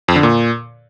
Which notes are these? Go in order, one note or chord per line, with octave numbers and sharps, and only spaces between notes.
F2
D3
A#2